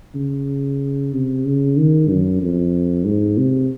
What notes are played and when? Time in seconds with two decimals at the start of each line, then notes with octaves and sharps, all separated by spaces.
0.15 C#3
1.13 C3
1.45 C#3
1.77 D#3
2.09 F#2
2.42 F2
3.06 G#2
3.38 C3